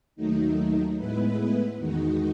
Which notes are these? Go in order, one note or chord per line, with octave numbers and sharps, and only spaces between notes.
D#2 D#3 F#3 A3 D#4
A2 G#3 B3 E4 B4
E2 D#3 G#3 D#4 F#4